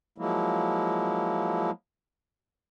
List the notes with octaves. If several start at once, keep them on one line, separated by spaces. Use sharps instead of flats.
F3 F#3 G#3 A#3 E4